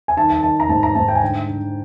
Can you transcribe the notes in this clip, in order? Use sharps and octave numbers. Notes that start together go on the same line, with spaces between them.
G#5
D#3 A5
A5
D#3 A5
A#5
G#2 A5
A#5
G#2 A5
G5
G#5
D3 G5
D3